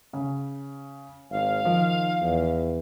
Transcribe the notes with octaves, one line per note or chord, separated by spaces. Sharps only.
C#3
G#1 F5
D#3 F3
E2